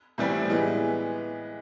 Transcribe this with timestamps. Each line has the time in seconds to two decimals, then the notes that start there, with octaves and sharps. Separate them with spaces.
0.18 A2 E3 G3 C4
0.49 E3 G#3 B3